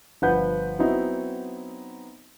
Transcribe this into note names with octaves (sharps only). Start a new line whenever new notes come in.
G1 F3 B4 F#5 G6
F#3 B3 C4 D#4 E4